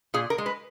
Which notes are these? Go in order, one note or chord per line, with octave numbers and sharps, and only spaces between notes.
A#2 G#4
A#4
G#3
B4